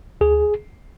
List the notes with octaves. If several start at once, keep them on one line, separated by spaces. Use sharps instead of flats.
D2 G#4